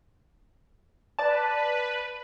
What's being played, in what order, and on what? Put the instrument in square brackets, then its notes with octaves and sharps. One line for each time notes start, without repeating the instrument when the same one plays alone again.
[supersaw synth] B4 [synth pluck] D5 A5